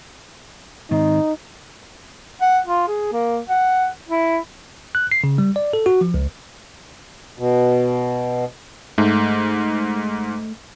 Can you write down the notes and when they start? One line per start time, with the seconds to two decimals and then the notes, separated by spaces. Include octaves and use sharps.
0.91 G#2 D#3 C4 D#4
2.41 F#5
2.66 F4
2.88 G#4
3.12 A#3
3.49 F#5
4.08 E4
4.95 F#6
5.12 C7
5.24 C#3
5.38 G3
5.56 D5
5.73 A4
5.86 F#4
6.01 F3
6.14 C#2
7.39 B2
8.98 G#2 A3